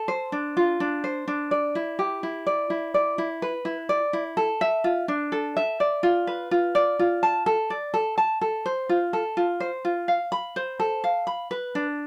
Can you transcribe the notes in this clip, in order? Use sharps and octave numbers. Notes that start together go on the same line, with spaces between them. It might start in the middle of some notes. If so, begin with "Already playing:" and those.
Already playing: A4
C5
D4
F4
D4
C5
D4
D5
E4
G4
E4
D5
E4
D5
E4
B4
E4
D5
E4
A4
E5
F4
D4
A4
E5
D5
F4
B4
F4
D5
F4
A5
A4
D5
A4
A5
A4
C5
F4
A4
F4
C5
F4
F5
B5
C5
A4
F5
B5
B4
D4